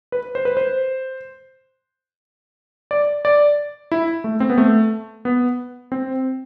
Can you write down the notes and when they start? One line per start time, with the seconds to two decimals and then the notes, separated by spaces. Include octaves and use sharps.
0.12 B4
0.35 C5
0.45 B4
0.57 C5
2.91 D5
3.25 D5
3.92 E4
4.24 A3
4.40 C4
4.50 B3
4.58 A3
5.25 B3
5.92 C4